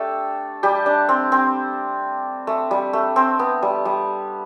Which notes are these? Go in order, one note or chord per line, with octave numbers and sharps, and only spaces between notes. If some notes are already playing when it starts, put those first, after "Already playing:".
Already playing: A3 D4 G4 A4
G3 G4
D4
C4
C4
A3
G3
A3
C4
B3
G3
G3